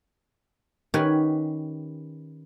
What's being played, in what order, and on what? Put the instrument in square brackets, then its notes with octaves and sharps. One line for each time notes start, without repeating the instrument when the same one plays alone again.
[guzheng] D#3 C#4 G4 B4 F#5 G#5